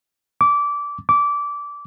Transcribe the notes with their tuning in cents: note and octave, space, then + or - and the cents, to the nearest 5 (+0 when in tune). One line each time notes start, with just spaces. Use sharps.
D6 -20
D6 -20